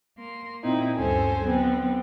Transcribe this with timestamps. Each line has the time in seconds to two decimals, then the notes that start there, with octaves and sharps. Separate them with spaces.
0.18 A#3 C6
0.62 A#2 C4 D#4 E4
0.95 D2 G2 C#4 A4 C5 G#5
1.43 D3 F#3 B3 C4